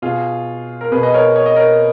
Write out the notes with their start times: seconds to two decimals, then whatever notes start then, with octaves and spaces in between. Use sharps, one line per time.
0.02 B2 F4 G#4
0.81 A#4
0.92 B2 G#4 B4
1.03 B4 D#5
1.14 A#4 C#5
1.36 C#5
1.46 D#5
1.56 A#4 C#5